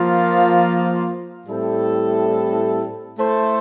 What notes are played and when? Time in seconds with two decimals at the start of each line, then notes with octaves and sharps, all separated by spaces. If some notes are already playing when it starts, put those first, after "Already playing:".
Already playing: F3 A#3 F4
1.47 A2 G3 C4 E4 A4
3.19 A3 E4 A4 C5